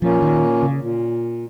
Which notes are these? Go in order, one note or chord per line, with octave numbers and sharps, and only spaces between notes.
A#2 F3 A#3 C#4
D#3
C#3
A#2